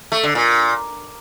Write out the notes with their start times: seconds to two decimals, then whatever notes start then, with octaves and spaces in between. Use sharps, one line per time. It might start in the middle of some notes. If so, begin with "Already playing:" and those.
0.12 A3
0.23 D3
0.35 A#2